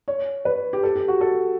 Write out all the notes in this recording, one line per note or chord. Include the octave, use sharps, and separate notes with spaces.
C#5
B4
G4
A4
G4
F#4
A4